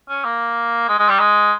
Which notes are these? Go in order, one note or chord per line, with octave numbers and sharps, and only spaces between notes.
C#4
A#3
G#3
G#3
G3
G#3